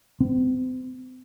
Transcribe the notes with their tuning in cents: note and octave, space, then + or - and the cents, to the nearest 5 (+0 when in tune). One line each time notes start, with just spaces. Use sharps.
C4 -40